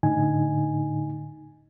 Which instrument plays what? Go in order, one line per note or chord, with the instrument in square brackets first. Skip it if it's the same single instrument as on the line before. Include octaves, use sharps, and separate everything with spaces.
[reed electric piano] A2 D3 D#4 G#5